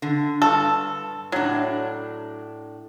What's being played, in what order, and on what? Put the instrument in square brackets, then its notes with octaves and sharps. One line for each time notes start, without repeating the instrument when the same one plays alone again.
[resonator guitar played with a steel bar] D3
[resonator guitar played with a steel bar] G2 [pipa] A4
[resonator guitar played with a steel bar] A2 D4 [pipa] F#3